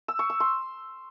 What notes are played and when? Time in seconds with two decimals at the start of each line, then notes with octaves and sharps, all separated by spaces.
0.08 E6
0.19 C#6
0.30 E6
0.40 C6